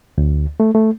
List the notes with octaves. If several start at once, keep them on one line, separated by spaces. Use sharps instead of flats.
D2
A3
A3